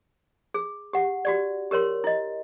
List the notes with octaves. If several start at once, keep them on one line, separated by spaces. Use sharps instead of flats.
G#4
G4 F#5
F#4 G4 D5
G4 A#4 C#5 C6
E4 D#5